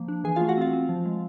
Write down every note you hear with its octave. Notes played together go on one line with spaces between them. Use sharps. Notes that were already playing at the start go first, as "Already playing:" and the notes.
Already playing: F3 A#3
D4
E3 G#4 G#5
F4 F5
A3
F#4 F#5
C4 F4 F5
C4
F3
G#3